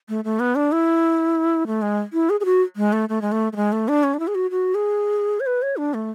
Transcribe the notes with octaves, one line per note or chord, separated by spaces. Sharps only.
A3
A3
B3
D4
E4
A3
G#3
E4
G#4
G#4
F#4
G#3
A3
A3
G#3
A3
A3
G#3
A3
D4
C#4
D4
E4
G#4
F#4
F#4
G#4
C#5
B4
C#5
D4
A3